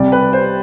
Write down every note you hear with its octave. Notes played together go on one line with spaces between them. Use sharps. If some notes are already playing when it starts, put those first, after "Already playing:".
Already playing: C2 C3 G3 D5
B4
C5